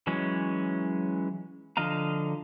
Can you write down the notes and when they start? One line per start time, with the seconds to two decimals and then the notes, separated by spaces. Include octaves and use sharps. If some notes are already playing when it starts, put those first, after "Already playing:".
0.07 E3 F#3 G#3 C#4
1.77 D3 F3 D#5 F5 A#5